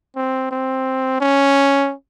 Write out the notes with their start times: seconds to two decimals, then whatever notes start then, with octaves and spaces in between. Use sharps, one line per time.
0.16 C4
0.51 C4
1.21 C#4